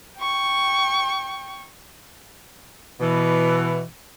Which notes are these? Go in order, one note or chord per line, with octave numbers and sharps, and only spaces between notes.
G5 C#6
B2 E3